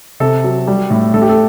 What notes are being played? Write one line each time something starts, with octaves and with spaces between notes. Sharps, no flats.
C3 A4
F#3
G3
A2
A2 A4
G4
A4